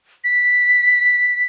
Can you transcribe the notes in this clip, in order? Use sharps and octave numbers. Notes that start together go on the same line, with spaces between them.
B6